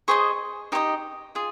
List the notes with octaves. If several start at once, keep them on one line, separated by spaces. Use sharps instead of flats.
G#4 C5 D#5 C#6
D#4 G4 C5 D#5
F4 G#4